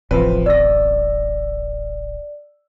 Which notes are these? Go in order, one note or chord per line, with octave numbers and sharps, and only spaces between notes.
D1 A1 C3 F3 B4
D5 E6 A#6